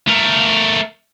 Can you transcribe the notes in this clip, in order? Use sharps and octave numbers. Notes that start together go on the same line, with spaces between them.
A3 A#4